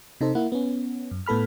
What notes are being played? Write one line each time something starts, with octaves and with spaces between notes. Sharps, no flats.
C3 D#4 A4 C5
A#3 E4 F#5
B3 C#4
F#2
A2 B3 A4 B5 F6